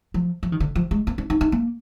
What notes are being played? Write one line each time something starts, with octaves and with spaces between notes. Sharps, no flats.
F3
F3
D#3
D3
F3
G#3
A#3
D4
D#4
D#4
A#3